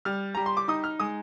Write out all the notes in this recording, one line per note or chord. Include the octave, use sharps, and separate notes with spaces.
G3 F6
G3 A#5
C6
D6
D#4 D#6
F6
G#3 D#6